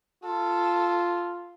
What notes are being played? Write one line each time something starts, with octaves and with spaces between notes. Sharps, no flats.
F4 A4